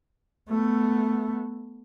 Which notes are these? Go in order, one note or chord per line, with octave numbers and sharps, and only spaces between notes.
A3 B3